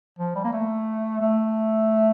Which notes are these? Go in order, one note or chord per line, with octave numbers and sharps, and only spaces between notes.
F3
G3
A#3
A3
A3